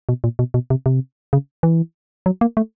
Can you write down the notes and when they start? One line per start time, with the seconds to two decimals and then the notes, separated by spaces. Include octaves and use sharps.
0.09 B2
0.24 A#2
0.39 B2
0.54 B2
0.70 C3
0.86 C3
1.33 C#3
1.63 E3
2.26 F#3
2.41 A#3
2.57 A3